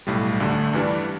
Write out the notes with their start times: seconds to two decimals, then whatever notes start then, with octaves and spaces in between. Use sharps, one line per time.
0.07 B1 A2 G3
0.40 D2 D3 A3
0.73 G2 E3 G3 D4